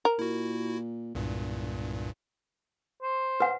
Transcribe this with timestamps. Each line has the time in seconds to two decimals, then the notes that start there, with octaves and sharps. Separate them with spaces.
0.05 A#4
0.19 A#2 E4 F#4
1.15 E1 C2 G2 A#2
3.03 C5
3.40 B4 F#5